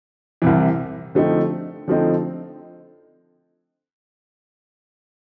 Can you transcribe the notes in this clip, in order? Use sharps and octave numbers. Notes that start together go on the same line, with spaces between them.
C2 C3 E3
D3 F3 A3 C4 D#4
D3 F3 A3 C4 D#4